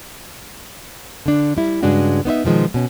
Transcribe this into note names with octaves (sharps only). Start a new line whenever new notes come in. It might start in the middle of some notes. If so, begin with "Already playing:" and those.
D3 D4
G3 E4
G2 C#3 G#3 D4 F#4
B3 D#4 C5 E5
B2 D#3 F3 G#3
B2 C#4